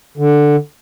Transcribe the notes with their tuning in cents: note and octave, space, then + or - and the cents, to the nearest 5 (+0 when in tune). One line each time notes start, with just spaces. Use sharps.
D3 +5